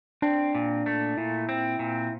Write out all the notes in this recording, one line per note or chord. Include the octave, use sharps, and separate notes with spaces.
C4 D4
A#2
A3
A#2 E4
C4
A#2